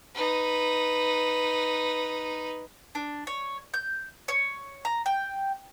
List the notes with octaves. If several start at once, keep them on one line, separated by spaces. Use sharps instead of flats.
D#4 B4
D4
C#5
G6
C#5
A#5
G5